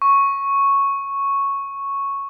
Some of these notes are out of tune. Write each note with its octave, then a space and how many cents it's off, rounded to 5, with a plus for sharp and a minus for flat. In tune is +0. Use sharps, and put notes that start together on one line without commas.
C#6 -5